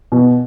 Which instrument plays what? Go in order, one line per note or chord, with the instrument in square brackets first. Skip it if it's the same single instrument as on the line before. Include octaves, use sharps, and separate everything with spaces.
[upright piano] B2